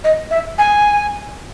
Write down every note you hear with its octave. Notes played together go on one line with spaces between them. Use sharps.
D#5
E5
G#5